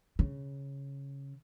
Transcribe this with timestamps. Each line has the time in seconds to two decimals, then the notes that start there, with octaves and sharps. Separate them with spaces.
0.19 C#3